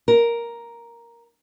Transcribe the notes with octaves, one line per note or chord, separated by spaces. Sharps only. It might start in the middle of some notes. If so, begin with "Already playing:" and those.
A#4